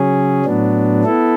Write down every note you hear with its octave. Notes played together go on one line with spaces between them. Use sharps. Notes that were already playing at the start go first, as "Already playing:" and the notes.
Already playing: C#3 F#3 C#4 G#4
A2 F#3 B3 D4
B3 E4 A4